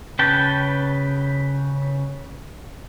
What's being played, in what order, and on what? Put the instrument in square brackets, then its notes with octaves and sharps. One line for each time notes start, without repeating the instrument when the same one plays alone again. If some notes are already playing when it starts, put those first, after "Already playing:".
[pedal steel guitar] C#3 B4 G5 A5